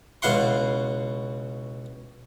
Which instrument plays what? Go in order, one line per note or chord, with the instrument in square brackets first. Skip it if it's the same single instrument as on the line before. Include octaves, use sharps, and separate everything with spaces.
[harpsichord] C#2 B2 E4 F5 F#5 C6